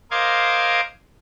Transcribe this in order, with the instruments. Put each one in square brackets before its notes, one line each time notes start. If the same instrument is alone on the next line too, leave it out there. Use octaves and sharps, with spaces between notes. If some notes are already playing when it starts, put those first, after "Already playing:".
[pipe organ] A#4 C5 D#5 F5 D6 G#6